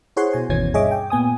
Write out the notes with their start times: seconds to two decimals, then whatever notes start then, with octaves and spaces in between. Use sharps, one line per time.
0.16 E4 G#4 C5 C#5 F#5 C6
0.33 B2 G#5
0.49 G1 D#2 B2 E3 C#4 G#6
0.74 G2 G#4 C#5 D#5 E5 D6
0.91 G5
1.10 A#2 B3 G#5 D#6